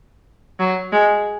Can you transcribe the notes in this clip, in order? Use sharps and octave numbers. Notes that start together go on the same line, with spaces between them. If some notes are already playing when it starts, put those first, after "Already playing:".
F#3
G#3